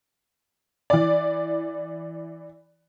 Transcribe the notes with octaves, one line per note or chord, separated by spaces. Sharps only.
E3 D5